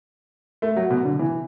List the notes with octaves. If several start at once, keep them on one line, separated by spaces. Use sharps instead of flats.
A3
F#3
B2
D3
E3